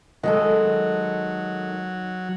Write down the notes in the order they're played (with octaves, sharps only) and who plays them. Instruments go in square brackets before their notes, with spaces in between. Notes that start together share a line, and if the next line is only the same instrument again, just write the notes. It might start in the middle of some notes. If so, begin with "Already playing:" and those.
[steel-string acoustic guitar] D#3 G#3 A4 [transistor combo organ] F#3